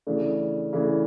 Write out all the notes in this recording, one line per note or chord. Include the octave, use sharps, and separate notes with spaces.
C#3 E3 A3 D4
C#3 E3 A3 D4